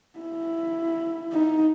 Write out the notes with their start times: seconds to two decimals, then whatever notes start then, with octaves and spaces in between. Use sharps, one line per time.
0.19 E4
1.32 D#4